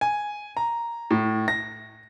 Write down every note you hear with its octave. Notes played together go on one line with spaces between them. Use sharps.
G#5
A#5
A2
A#6